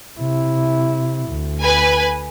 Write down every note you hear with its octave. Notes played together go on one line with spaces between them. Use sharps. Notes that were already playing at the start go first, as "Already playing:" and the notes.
C3 E4
D2
B4 G#5